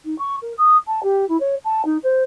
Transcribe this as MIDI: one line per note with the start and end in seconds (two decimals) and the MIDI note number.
0.04 0.16 63
0.18 0.36 85
0.42 0.53 70
0.57 0.76 87
0.87 1.00 81
1.02 1.27 67
1.28 1.36 64
1.40 1.55 73
1.64 1.82 81
1.84 1.97 63
2.03 2.22 72